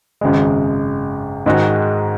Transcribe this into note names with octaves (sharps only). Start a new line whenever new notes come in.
G#1 F#2 C#3 G#3
G#2 D#3 G#3 F#4